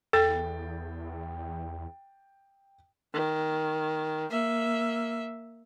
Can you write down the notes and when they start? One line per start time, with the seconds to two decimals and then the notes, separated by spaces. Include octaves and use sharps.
0.13 E2 A4 G5 A6
3.13 D#3
4.30 A#3 E5